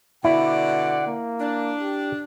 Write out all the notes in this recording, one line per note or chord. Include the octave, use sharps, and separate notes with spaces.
B2 D3 E4 D5 F#5
A#3
D4
G4